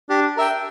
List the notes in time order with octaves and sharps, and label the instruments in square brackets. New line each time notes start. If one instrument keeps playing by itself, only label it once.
[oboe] D4 [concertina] G4
[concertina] A#4 E5 G5